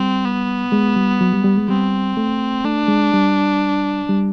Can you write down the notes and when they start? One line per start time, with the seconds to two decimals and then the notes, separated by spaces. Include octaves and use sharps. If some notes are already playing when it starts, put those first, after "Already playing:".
Already playing: G3 C4
0.25 B3
0.72 G#3
0.96 G3
1.21 F#3
1.33 G3
1.44 G3
1.57 G#3
1.68 G3 C4
2.17 A3
2.64 A3 D4
2.88 G#3
3.13 G3
4.09 G3